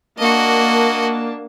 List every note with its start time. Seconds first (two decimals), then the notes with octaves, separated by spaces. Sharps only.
0.18 A#3 D4 F#4 D#5 A5